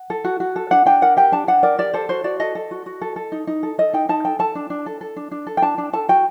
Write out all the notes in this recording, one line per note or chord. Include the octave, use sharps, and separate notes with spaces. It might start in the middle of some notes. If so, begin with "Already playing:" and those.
Already playing: F#5
A4
F#4
F#4
A4
D4 F#5
D4 G5
A#4 F#5
G4 G5
D4 A5
D4 F#5
A#4 D5
G4 D5
A4 C5
F#4 C5
F#4 D5
A4 D#5
A4
F#4
F#4
A4
A4
D#4
D#4
A4
A4 D#5
D#4 G5
D#4 A5
A4 G5
A4 A5
D4
D4
A4
A4
D4
D4
A4
G5
D4 A5
D4
A4 A5
F#4 G5